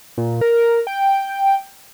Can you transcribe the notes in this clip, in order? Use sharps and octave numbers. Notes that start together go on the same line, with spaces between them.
A#2
A#4
G5